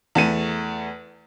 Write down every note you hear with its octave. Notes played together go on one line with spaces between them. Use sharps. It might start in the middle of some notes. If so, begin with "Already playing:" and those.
E2 A3 D#7